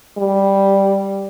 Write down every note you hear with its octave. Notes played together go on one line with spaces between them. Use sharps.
G3